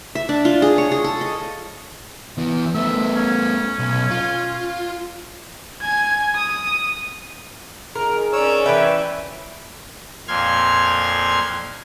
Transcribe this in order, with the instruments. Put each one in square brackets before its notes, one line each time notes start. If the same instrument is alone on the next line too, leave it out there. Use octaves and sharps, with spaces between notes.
[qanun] E5
D4
F4
G#4
C#5
G#4
A4
D#5
[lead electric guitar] E3 B3
[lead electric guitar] A3 B3 [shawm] E5
[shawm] C#4
[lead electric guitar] B1
F4
[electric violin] G#5 G#6
D#6
[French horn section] F2 D#3 G#4 [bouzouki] A#4
[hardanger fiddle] C#4 D5 [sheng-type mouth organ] C#5 E6
[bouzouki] E3 E5 [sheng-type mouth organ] B4 G5
[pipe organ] F2 A#2 C6 F6 G#6